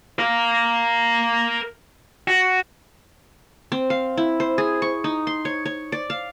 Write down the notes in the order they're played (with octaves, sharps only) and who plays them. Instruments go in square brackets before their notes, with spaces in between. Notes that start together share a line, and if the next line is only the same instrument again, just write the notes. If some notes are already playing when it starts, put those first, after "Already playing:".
[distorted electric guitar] A#4 F5
F#4
[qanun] C4
F5
E4
C5
G#4
C#6
D#4
C6
C#5
C#5
D5
F5